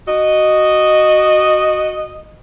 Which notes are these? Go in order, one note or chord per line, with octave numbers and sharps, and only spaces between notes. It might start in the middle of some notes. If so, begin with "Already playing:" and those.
F#4 D#5